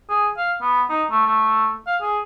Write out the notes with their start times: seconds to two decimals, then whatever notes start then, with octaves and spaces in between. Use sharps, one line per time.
0.09 G#4
0.37 F5
0.61 B3
0.90 D#4
1.11 A3
1.26 A3
1.87 F5
2.01 G#4